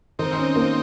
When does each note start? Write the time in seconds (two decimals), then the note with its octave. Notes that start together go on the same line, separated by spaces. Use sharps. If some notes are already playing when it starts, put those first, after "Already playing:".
0.19 D#3 C4 D#4
0.38 C#4
0.56 A#3